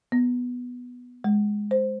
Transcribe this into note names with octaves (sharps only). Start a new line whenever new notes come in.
B3
G#3
C5